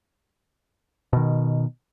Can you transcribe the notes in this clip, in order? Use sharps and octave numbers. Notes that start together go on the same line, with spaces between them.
B2 D#3